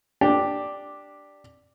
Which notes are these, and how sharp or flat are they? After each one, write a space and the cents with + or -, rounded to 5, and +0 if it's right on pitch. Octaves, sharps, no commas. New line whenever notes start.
D4 +0 G4 +0